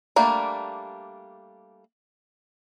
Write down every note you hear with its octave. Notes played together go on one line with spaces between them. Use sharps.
G3 A3 A#3 D4